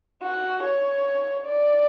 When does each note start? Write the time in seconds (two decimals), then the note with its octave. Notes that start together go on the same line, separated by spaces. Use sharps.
0.22 F#4
0.63 C#5
1.46 D5